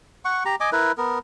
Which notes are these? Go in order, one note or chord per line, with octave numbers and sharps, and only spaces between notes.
F#5 C#6
G4 A#5
D#5 G#5 D6
E4 A#4 B4
B3 A#4